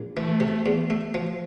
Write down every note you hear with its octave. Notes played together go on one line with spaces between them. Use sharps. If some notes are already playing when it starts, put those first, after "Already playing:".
Already playing: A#1
E3 A3
C3
E2
A3
F3